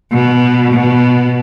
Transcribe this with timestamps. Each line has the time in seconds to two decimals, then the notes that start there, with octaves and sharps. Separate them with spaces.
0.12 B2
0.73 B2